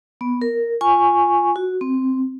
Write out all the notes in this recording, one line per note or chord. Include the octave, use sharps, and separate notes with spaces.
B3
A#4
F4 G#5 C#6
F#4
C4